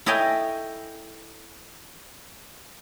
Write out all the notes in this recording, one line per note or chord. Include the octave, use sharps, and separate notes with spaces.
E4 A4 C#5 D#5 G5 G#5